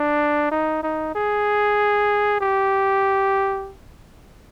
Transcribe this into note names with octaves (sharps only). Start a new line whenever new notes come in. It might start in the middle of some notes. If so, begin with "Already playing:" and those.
Already playing: D4
D#4
D#4
G#4
G4